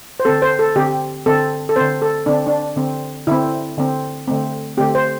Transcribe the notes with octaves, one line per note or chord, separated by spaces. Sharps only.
C5
D3 C4 A4
C5
A4
D3 C4 G4
D3 C4 A4
A4
D3 C4 C5
A4
D3 C4 D4
D4
D3 C4
D3 C4 E4
D3 C4
D3 A3 C4
D3 A3 C4 G4
C5